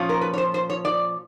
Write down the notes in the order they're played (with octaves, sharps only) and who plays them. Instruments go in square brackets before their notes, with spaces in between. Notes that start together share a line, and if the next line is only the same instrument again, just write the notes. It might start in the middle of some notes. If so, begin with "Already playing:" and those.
Already playing: [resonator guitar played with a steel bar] A#2 F3 C#4 F4
A#4
B4
C#5
C5
C5
C#5
D5